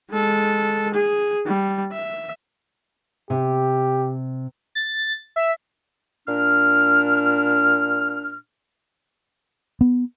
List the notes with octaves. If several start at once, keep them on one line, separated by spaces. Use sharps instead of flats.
G#3 A4
G#4
G3
E5
C3 G4
A6
E5
A#2 D4 F6
B3